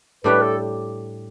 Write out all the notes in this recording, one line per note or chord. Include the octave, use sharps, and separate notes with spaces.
A2 G3 D4 G4 B4
A4